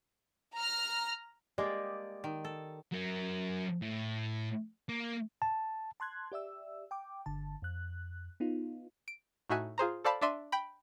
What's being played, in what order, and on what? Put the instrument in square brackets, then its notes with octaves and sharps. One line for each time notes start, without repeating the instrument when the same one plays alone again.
[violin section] A#5 F6
[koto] G#3 A#3 [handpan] G4 D5 D#5
[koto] D#3
A4
[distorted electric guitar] F#3 A#4
A2
A#3
[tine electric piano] A5
[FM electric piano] A5 C6 F#6 G#6
G4 D5 E5 E6
G5 D6
G1 D3 A5
F2 F#6
B3 D#4 F4
[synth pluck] D7
A2 D#4 F#4 E5 G#5 F#6
F4 G#4 C5 A#5
A4 C5 D5 F5 A5 B5
D4 D5 E5 C6 D#7
G5 B5